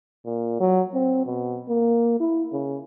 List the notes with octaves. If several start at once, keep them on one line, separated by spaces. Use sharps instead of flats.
A#2
F#3
C4
B2
A#3
E4
C#3